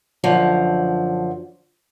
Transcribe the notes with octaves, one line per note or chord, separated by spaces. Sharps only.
F#2 D3 F3